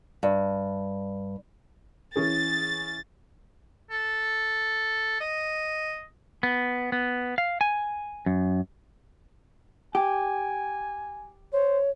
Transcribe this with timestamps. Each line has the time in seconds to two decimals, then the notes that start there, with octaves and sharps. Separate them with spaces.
0.23 G2
2.16 E3 C#4 G#4 A6
3.90 A4
5.21 D#5
6.43 B3
6.92 B3
7.38 F5
7.61 G#5
8.26 F#2
9.95 G4 G#5
11.53 C5 C#5